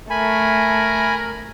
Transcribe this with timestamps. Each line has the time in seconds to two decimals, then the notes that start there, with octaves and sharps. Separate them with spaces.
0.10 A3 A#4 G#5 B5